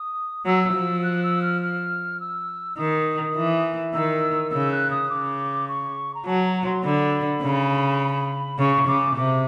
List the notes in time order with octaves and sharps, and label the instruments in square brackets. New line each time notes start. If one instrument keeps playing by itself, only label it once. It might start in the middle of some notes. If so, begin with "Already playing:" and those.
Already playing: [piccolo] D#6
[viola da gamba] F#3 [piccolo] E6
[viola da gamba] F3
[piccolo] F#6
E6
F6
F6
E6
[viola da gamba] D#3 [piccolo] D#6
[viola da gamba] E3
[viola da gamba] D#3 [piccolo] E6
[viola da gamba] C#3 [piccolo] E6
[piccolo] F#6
D#6
[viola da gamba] C#3 [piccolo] D6
[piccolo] C#6
A#5
[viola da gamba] F#3 [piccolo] A5
[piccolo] A#5
C6
[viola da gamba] D3 [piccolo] B5
[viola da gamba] C#3
[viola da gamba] C#3 [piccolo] C#6
[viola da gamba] C#3 [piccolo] D6
[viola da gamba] C3 [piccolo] D6